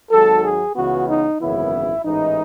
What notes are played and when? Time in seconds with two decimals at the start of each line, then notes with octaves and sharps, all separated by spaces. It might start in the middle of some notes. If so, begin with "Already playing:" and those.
0.11 G#1 G#2 F#3 A4
0.44 G#4
0.75 C#2 C#3 E3 G#3 B3 F#4
1.09 D#4
1.40 G#1 F#2 C#3 E3 B3 E4
2.05 A1 G#2 E3 D#4